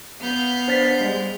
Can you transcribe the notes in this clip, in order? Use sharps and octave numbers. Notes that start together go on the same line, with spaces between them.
B3 F5 F6 G6
D4 C5 F#5 A6 B6
G3 G#3